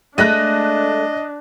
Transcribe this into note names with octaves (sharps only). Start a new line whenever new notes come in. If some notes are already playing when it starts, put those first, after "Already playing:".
G#3 A3 D4 D#5 F#6 A#6 D#7